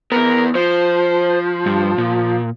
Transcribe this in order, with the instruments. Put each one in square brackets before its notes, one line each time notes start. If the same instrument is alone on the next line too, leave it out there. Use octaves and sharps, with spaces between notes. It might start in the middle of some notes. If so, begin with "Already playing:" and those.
[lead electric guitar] E2 B3 [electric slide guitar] A#4
[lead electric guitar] F3 [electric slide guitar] C5
[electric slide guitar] G2
A#2